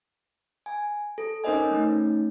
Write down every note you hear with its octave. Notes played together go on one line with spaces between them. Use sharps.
G#5
A4
C#4 D#4 A#4 C5 D#5 G#5
A3 C#4 D#4